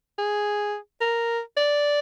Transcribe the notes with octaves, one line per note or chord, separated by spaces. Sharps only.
G#4
A#4
D5